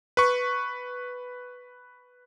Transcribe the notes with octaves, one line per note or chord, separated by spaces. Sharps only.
B4 C#6